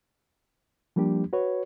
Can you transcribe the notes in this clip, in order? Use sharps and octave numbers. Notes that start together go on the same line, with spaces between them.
F3 G3 A#3 D4 G4
F#4 B4 C#5